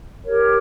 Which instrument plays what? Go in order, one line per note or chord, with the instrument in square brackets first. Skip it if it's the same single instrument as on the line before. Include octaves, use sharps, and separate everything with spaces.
[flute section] G4 A#4 C#5